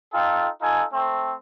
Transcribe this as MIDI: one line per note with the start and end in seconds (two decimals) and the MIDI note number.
0.13 0.49 63
0.13 0.49 65
0.13 0.49 69
0.13 0.49 79
0.61 0.85 63
0.61 0.85 65
0.61 0.85 69
0.61 0.85 80
0.93 1.35 57
0.93 1.35 60